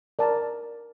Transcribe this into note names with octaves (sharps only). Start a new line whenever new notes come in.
A#4 D5 A5